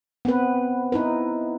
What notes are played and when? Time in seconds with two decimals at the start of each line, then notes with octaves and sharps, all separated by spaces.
0.25 B3 C4 B4
0.92 D#4 E4 B4